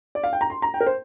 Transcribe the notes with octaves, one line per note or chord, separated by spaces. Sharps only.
D5
F5
G5
A#5
C6
A#5
G5
A#4
C5